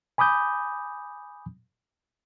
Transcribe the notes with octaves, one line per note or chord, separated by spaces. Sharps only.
G#5 B5 D6 D#6 G6